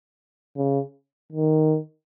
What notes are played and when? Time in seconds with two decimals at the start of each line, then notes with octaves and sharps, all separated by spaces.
0.57 C#3
1.33 D#3